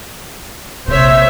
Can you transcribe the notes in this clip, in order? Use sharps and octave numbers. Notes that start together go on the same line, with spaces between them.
A#1 C3 C5 C#5 E5